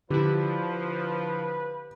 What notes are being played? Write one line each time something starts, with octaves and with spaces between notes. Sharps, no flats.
D3 F3 E4 G4 B4